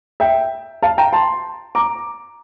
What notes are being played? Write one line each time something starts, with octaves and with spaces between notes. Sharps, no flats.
E5 G5
F5 A5
G5 A#5
A5 C6
A#5 D6